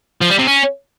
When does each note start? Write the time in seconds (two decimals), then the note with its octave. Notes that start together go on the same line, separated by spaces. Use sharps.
0.21 F3
0.30 G3
0.38 C3
0.47 C#4